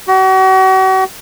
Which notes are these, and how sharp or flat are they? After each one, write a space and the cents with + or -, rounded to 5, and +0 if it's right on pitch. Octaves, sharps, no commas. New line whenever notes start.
F#4 +40